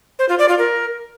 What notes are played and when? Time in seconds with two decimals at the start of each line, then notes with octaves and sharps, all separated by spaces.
0.19 C5
0.29 F4
0.39 D5
0.49 F4
0.59 A#4